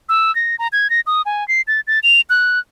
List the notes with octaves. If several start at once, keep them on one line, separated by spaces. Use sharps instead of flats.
E6
A#6
A#5
G#6
A#6
D#6
G#5
C7
A6
A6
F7
F#6